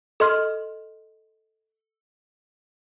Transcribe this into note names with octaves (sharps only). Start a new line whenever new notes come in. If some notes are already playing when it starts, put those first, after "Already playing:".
A4 D#5 C6 F6